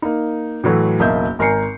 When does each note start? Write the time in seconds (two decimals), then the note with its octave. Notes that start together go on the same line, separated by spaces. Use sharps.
0.02 A#3 D#4
0.64 A2 E3 F#3 A3
1.00 F#1 B1 A#3 D#5 E5 G6
1.39 G#1 A#4 G#5 A#5 C7 C#7